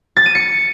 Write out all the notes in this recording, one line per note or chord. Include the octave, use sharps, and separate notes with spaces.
A6
D#7
C#7